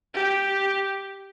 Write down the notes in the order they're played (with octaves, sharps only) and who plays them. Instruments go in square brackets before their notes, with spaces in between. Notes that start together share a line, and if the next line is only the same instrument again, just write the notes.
[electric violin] G4